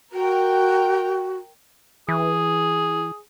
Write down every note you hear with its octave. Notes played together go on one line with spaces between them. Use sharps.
F#4 A#4 G5
E3 G#4